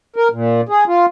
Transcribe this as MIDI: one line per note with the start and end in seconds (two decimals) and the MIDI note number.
0.16 0.28 70
0.32 0.61 46
0.69 0.84 68
0.87 1.06 65